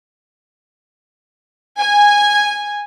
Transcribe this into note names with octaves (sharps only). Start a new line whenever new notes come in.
G#5